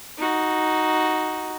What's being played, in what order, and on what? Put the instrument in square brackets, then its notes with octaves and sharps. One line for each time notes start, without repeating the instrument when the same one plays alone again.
[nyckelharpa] D#4 F#4